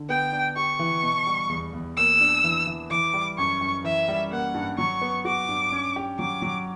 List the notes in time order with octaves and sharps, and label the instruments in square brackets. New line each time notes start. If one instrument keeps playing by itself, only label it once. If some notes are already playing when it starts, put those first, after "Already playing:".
Already playing: [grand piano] D3
[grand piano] B3 [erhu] G5
[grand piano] D4
[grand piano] G4 [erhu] C#6
[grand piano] E3
B2
G3
E2
E2
[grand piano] A#3 [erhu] E6
[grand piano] D4
E3
E3
[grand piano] E3 [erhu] D6
[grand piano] G3
[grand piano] F#2 [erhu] C#6
[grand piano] F#2
[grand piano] E3 [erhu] E5
[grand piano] G3
[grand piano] A#3 [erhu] F#5
[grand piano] G2
[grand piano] F#3 [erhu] C#6
[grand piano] B3
[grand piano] F#4 [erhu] D6
[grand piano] G2
C#4
G4
[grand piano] F#3 [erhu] D6
[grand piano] F#3